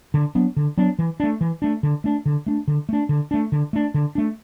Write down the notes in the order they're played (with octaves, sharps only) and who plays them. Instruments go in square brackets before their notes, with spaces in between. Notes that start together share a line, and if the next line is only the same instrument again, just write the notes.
[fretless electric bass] D3
F#3 B3 D4
D3
F#3 B3 D4
E3
A3 D4
E3
A3 D4
D3
A3 D4
D3
A3 D4
D3
A3 D4
D3
A3 D4
D3
A3 D4
D3
A3 D4